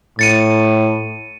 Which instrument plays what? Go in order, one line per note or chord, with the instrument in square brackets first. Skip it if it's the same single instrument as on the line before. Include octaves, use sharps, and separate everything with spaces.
[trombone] A2 [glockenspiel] A6 C#7 D#7